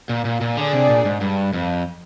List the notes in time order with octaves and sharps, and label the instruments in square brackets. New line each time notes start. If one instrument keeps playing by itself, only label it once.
[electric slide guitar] A#2
A#2
A#2
[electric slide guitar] D3 [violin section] D4 G#4 D5
[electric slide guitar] C3
A#2
G#2
G2
F2